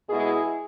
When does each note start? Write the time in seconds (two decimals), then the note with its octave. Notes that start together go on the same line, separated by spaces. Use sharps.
0.10 B2 G#3 E4 G#4